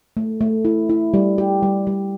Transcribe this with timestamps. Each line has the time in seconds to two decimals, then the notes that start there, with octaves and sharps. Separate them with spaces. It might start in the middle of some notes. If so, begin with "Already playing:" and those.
0.17 A3
0.41 A3
0.65 E4
0.89 E4
1.14 G3
1.38 G4
1.63 G3
1.87 G3